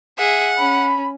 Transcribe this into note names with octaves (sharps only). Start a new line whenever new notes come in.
G#4 E5 F#5
C#4 B5